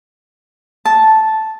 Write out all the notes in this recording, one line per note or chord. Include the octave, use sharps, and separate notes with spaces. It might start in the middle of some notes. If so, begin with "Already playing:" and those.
A5